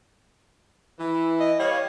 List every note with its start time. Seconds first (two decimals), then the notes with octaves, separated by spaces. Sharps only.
0.99 E3
1.40 D#5
1.60 G3 C#5 F5